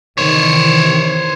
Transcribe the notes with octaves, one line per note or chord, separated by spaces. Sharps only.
C3 D#3 E3 C5 C#5